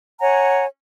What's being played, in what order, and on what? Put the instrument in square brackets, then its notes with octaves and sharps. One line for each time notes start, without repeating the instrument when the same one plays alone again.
[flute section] C#5 F#5 G#5 A#5